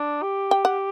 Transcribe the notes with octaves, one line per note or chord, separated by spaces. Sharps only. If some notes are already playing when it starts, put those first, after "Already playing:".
Already playing: D4
G4
G5
F#5